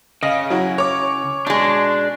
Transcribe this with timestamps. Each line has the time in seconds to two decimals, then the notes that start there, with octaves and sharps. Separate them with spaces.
0.23 C#3 D#5 F5 A#6
0.50 F#3 E4 F#4
0.78 C#5 D6
1.47 B2 G#3 D4